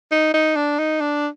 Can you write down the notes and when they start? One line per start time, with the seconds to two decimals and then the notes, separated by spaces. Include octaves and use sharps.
0.11 D#4
0.34 D#4
0.56 D4
0.79 D#4
1.00 D4